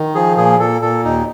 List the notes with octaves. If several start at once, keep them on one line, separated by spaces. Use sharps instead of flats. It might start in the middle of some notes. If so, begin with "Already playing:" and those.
Already playing: D#3
F3 G#4
A#2 G#4
A#2 A4
A#2 A4
D#2 D#4